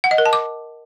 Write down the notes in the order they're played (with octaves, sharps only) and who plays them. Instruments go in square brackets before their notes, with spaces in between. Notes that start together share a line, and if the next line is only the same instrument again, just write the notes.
[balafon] F#5
D#5
A#4
A5
D6